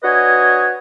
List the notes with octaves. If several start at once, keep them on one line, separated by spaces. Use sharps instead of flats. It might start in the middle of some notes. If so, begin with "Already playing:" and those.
D4 F#4 B4 C#5 D#5 G#5